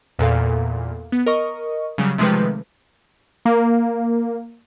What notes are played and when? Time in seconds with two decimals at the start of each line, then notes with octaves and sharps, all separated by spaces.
0.19 E2 A#2 A4 F5
1.12 B3
1.26 A#4 D#5 C#6
1.98 C#3 F#3 G3
2.18 C3 D#3 F3 G#3 A3 B4
3.45 A#3